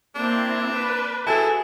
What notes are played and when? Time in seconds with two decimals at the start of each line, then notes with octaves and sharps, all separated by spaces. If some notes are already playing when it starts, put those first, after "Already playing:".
0.15 A#3 C4 D4 E4
0.72 B4
1.27 E4 F#4 G#4 A4 G#5 A5